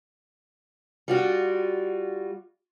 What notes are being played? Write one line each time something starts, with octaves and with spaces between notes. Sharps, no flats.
G3 F4 F#4